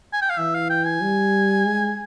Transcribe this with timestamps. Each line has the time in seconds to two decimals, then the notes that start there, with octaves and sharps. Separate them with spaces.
0.13 G#5
0.21 G5
0.30 F5
0.38 E3 E5
0.54 F5
0.70 G5
0.86 G#5
1.01 G3
1.65 G#3